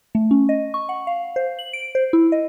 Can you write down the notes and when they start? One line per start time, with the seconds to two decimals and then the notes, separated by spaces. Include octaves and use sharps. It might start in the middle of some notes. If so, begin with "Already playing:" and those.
0.15 A3
0.31 C#4
0.49 D#5
0.74 C#6
0.89 F#5
1.07 F5
1.36 C5
1.59 F#7
1.73 D7
1.95 C5
2.13 E4
2.32 D#5